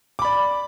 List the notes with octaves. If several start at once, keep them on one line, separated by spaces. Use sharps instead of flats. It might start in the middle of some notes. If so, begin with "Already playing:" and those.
D5 B5 D6